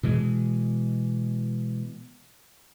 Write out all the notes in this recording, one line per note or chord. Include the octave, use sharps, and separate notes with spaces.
B2 E3 G#3